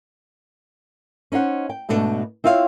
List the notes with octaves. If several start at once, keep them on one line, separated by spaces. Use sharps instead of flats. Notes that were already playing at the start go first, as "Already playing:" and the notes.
C#4 D#4 C5 F#5
G5
G#2 B2 A3 D4
C4 E4 F4 C#5 F5